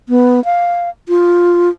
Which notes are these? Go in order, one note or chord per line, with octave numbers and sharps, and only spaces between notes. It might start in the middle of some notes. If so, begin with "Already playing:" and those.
B3
F5
F4